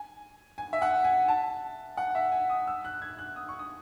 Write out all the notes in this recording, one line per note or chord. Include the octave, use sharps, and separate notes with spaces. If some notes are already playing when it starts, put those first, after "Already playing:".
Already playing: G#5
G#5
E5
F#5
G#5
A5
F#5
E5
G#5
D#6
E6
F#6
G#6
F#6
D#6
C#6
D#6